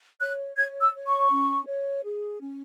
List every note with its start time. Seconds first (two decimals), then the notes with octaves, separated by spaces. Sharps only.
0.20 C#5 F#6
0.56 C#5 G#6
0.81 E6
0.94 C#5
1.06 C#6
1.30 C#4
1.66 C#5
2.03 G#4
2.40 C#4